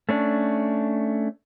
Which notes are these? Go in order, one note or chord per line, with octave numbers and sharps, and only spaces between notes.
A3 C#4 D4